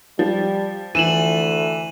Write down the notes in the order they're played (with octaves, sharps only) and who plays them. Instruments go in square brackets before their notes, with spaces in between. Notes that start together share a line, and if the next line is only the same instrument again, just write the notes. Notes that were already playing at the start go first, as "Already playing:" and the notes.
[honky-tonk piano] F3 [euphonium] G3
[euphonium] D2 [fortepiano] E3 [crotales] D#7 E7 F#7